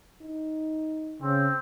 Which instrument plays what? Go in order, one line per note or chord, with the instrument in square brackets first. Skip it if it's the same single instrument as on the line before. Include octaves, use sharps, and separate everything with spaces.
[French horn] D#4
[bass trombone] C#3 [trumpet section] C4